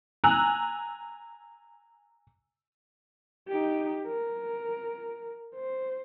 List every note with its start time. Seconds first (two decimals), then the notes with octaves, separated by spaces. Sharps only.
0.24 G#5 A#5 E6 F#6
3.49 D#4 G4
4.07 A#4
5.55 C5